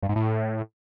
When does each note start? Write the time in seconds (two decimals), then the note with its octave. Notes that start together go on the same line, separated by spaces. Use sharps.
0.02 G2
0.09 G#2
0.16 A2